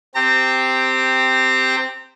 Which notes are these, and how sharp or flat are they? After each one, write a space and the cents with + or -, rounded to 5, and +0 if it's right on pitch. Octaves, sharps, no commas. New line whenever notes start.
C4 -5 G4 +0 A#5 -35